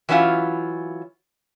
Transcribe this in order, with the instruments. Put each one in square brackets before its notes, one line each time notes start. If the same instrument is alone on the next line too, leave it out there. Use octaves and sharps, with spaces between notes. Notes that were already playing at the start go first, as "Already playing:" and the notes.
[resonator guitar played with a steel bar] E3 F#3 C#4 E4 F4